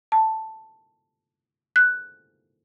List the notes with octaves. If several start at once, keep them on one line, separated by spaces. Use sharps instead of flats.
A5
F#6